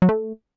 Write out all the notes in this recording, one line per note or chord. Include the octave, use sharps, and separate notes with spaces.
F#3
A3